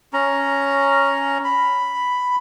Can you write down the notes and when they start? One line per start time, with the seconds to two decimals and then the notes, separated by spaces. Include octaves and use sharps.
0.13 C#4 A#5
1.44 B5